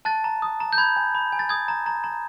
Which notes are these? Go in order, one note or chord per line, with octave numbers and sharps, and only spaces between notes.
A5 F#6 A6
A#5
D#6
A#5
G6
B5 G#6
G#5
B5
G#5
A6
D#6 G#6
A#5
A#5
A#5